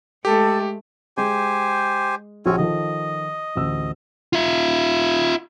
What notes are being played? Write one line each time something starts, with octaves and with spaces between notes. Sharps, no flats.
G#3 A3 G4 A4
G#3 G4 C5 G#5
A#1 C4 C#4 F#4 C#5
D#3 F3 A4 D#5
A1 D2 E6
F4 E5